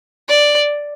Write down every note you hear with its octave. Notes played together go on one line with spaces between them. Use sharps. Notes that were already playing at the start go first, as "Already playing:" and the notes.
D5